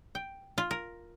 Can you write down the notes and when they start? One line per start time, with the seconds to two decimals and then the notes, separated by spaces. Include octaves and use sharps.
0.15 G5
0.58 F4
0.71 A#4